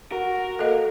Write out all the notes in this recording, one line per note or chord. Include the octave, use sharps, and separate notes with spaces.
F#4 A#4
A#3 A4 D#5